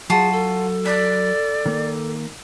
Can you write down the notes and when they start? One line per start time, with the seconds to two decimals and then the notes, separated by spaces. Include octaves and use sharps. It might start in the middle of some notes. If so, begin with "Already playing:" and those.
0.10 F#3 F4 F#4 G#4 A5
0.32 A4
0.86 D5 B5
1.66 D#3 A#3